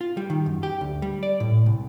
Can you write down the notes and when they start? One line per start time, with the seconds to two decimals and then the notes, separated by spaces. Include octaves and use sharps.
0.01 F4
0.17 G3
0.30 D#3
0.46 F#2
0.63 G4
0.81 D2
1.02 G3
1.23 D5
1.40 A2
1.66 C2